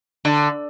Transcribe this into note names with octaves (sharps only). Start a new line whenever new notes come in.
D3